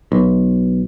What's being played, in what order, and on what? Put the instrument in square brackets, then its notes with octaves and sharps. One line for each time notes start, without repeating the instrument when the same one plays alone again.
[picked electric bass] B1